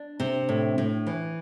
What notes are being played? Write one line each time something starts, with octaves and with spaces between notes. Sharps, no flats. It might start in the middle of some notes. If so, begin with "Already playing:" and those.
Already playing: D4
C3
A2
A2
E3